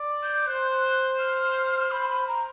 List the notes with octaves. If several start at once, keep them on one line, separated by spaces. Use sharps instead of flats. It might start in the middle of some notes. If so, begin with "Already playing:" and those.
Already playing: D5
G6
C5 F#6
F#6
F6
C5 B5
B5
A#5